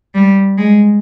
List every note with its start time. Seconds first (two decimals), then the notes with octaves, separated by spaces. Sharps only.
0.15 G3
0.58 G#3